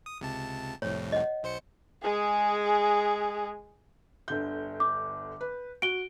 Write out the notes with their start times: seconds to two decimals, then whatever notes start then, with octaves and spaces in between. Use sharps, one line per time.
0.06 D#6
0.21 C#2 C3 A5
0.82 C2 F2 A2 C#5
1.12 D#5 F#5
1.43 B1 C5 C#7
2.02 G#3 G#4
4.28 G1 D3 G6
4.80 D6
5.41 B4
5.82 F#4 D7 G7